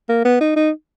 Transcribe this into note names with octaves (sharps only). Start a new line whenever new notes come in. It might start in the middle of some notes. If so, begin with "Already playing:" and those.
A#3
B3
D#4
D#4